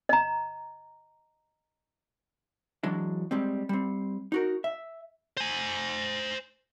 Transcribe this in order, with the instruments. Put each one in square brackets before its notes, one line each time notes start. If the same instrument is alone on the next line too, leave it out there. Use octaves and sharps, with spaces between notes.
[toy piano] D#5 A#5
[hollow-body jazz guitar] E3 F#3 G#3 D4
G3 G#3 C4
G3 C4
D#4 F#4 A#4
E5
[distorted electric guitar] C5 G#5